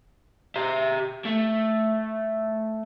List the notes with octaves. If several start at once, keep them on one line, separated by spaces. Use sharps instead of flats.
G4 E5
A3